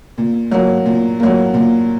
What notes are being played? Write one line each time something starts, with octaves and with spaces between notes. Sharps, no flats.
A#2
F#3 A#3
A#2
F#3 A#3
A#2